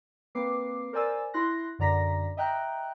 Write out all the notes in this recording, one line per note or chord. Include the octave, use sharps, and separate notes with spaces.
A#3 C4 B4 D6 C7
A#4 C5 D5 G#5 E6 A6
E4 C6 F#6 A#6
F#2 D3 D5 A#5 A#6 B6
D#5 E5 G5 A#5 F#6